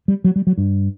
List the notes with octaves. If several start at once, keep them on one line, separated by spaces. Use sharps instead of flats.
G3
F#3
G3
F#3
G2